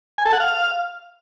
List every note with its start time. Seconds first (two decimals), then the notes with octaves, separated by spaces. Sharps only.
0.18 G#5
0.25 A4
0.33 F#5
0.40 F5